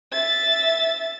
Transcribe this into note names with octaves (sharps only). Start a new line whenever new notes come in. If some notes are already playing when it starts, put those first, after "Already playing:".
E5 A6